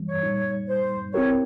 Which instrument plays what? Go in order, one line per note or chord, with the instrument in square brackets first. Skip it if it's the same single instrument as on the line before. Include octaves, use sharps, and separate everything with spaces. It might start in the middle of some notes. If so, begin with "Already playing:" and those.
Already playing: [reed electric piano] E3 G3 A#3
[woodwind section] C#5
[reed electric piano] A#2 G3 A#3 D#4
[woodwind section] C5
[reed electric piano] C4 E4 G4 A#4 [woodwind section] C#5